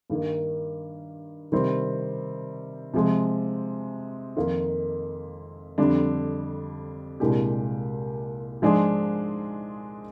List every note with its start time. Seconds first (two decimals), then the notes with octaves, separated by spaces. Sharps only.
0.10 G2 D#3 A#3
1.52 C3 D#3 G3 C4
2.94 C3 F3 G#3
4.36 F2 D#3 A#3 F4
5.78 F2 D3 G3 D4
7.20 C2 A#2 G#3 D4 G4
8.62 G#2 F3 G#3 D4 G#4